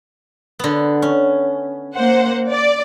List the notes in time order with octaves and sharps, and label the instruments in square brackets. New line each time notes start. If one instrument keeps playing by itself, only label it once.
[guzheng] D3 B3
C#4
[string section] A#3 C5 F#5
D5